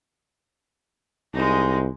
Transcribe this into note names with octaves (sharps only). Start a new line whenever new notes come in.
C2 G#3 D#4